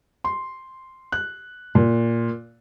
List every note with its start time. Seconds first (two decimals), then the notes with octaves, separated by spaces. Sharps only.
0.24 C6
1.12 F#6
1.75 A#2